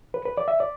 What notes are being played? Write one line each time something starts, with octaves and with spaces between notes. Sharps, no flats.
B4
B4
D5
E5
D5